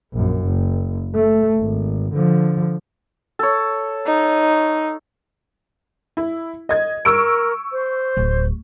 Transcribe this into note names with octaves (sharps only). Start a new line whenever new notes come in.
A#1 F#2
F#1
A3
G#1
D3 F3
A4 C#5
D#4
E4
D#5 G#6
A#4 C#6 E6 D7
C5
D1